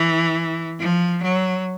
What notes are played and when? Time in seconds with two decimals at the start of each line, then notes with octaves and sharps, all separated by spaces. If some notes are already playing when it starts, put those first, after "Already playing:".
Already playing: E3
0.79 F3
1.22 F#3